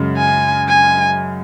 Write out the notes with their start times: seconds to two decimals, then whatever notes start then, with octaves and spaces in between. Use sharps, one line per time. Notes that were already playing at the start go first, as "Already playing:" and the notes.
Already playing: F#2 C#3 G#3
0.17 G#5
0.68 G#5